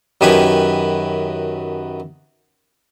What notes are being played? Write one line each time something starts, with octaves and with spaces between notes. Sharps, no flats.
F#2 D#3 G4 B4 G#5 B5